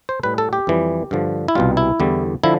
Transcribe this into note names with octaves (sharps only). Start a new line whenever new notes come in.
C5
A2 G3 B4
A4
G4
F2 E3 G3
G2 D3 F3
E4
C2 B2 G3 F4
E4
E2 D3 G3
D3 F3 E4